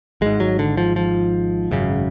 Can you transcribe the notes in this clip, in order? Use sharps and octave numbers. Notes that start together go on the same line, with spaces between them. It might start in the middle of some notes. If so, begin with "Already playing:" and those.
G#1 G#2 G#3
F#3
D3
F3
F3
G#1 F#2 C#3